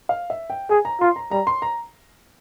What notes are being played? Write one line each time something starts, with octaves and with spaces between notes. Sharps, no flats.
F5
E5
G5
G#4 G#5
A#5
F4 C6
A#5
G3 A#5
C6
A#5